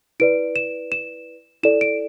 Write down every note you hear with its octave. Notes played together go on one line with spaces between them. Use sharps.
E4 B4 D5 D7
E7
E7
E4 A4 D5 E7
D7